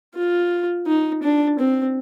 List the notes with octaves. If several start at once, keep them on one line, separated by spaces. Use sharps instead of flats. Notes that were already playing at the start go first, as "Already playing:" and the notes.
F4
D#4
D4
C4